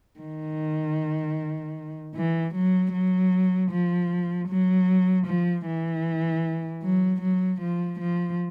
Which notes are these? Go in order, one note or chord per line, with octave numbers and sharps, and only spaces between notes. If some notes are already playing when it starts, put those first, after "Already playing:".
D#3
E3
F#3
F#3
F3
F#3
F3
E3
F#3
F#3
F3
F3